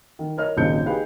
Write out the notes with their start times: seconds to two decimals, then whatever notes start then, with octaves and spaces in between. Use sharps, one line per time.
0.19 D#3
0.38 A#4 C#5 D#5 F6
0.57 D#1 G#1 C#3 D#4 G6 C#7
0.86 D#4 G4 G#4 B4 F5